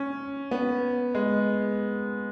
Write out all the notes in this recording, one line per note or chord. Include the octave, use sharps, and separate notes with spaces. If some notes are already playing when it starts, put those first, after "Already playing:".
Already playing: C#4
B3
G#3